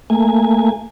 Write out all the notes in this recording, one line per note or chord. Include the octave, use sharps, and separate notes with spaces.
A3 A#3 G#5